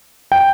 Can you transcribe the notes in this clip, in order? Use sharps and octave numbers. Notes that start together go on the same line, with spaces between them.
G5